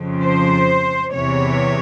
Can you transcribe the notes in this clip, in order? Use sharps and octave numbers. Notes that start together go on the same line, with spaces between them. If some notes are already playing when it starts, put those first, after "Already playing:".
Already playing: F2 C#3 F3
C5
E2 C3 E3 C#5